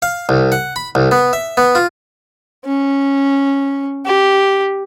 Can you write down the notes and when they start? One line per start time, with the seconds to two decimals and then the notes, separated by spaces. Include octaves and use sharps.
0.02 F5
0.29 C2
0.52 F#5
0.76 B5
0.95 C2
1.11 B3
1.33 E5
1.57 B3
1.75 F4
2.65 C#4
4.06 G4